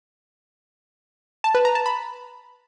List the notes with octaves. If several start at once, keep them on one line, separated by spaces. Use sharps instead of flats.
A5
B4
A#5
A5
B5